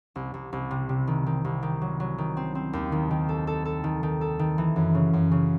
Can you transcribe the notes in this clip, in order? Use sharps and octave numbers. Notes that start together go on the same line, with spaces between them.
C2
C2
C2
C3
C3
D#3
D#3
C2
D#3
F#3
F#3
D#3
C4
C4
D#2
D#3
D#3
A4
A4
A4
D#3
D#3
A4
D#3
E3
F#2
C#3
F#2
C#3